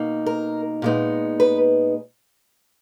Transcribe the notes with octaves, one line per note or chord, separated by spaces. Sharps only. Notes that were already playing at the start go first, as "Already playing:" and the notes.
Already playing: B2 A#3 D#4
A#4
A#2 G#3 B3 D#4
B4